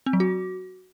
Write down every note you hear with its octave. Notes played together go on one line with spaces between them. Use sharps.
C4
F#3
F#4